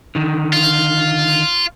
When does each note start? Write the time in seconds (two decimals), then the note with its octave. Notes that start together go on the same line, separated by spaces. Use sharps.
0.15 D3 D#3
0.53 F4